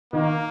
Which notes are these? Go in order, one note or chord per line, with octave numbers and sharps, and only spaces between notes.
D#3 A#3